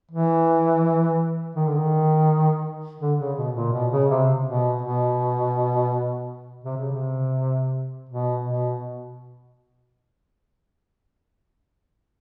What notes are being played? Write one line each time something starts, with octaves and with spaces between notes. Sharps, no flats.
E3
D#3
D3
D#3
D3
C#3
B2
A#2
B2
C#3
C3
B2
B2
C3
C#3
C3
B2
B2